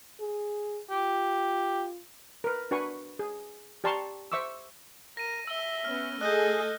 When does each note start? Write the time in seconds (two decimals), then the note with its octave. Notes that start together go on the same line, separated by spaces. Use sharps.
0.21 G#4
0.90 F4 G4
2.44 A#4 B4
2.71 D4 F#4 B4 G#5 C#6
3.19 G#4
3.84 G4 D5 A5 A#5 C6 C#6
4.32 C5 E5 C#6 D6 E6
5.17 A#4 A#6 D#7
5.47 E5 E6 G7
5.84 B3 C#4 F6
6.21 A3 G#4 A4 D#5 F#6 G6